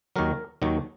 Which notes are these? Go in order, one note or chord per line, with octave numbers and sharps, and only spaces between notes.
D#2 D#3 F#3 A#4
D#2 D#3 F#3